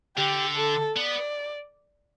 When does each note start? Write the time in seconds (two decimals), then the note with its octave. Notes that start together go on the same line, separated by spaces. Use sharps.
0.17 D3 G4
0.57 A4
0.97 B3 D5